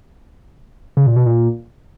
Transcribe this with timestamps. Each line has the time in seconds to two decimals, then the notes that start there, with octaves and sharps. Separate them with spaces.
0.97 C#3
1.07 A#2
1.16 B2
1.26 A#2